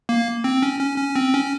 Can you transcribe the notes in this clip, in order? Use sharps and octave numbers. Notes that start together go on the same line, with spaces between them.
A#3
C4
C#4
C#4
C#4
C4
C#4